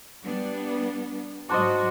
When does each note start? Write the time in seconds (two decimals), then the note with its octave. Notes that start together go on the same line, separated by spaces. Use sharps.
0.23 G3 B3 D4
1.49 G#2 F#3 D4 F#4 C5 D#5